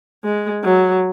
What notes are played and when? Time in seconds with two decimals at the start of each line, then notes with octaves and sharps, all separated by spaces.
0.24 G#3
0.64 F#3